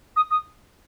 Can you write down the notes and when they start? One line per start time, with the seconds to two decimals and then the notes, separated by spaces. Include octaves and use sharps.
0.16 D#6
0.31 D#6